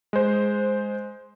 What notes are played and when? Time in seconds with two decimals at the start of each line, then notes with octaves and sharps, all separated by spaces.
0.13 G#3 C5